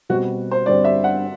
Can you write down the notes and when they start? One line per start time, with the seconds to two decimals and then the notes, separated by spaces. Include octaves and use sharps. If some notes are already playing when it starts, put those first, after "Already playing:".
0.09 B2 G3 C4 F#4
0.51 C5
0.66 G2 D3 G3 C4 D5
0.84 E5
1.04 F#5